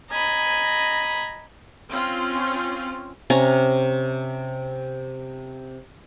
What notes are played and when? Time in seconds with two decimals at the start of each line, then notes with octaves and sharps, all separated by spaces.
0.12 D#5 G#5 A#5 B5
1.91 C4 C#4 F4
3.30 C3 C#4 A#5